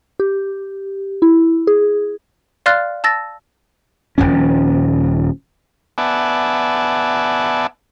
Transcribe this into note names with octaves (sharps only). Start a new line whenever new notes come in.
G4
E4
G#4
D5 F5 C6 F6 F#6 A6
A5 E6 A6 A#6
D#1 G#1 F3 C#4
B3 D5 E5 F#5 G#5 A5